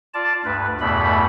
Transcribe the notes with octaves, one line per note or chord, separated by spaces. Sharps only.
F4 D5 A5
D2 G2 B4
E2 G2 B2 A3 B5